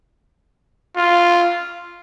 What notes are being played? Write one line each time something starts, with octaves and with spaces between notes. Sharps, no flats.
F4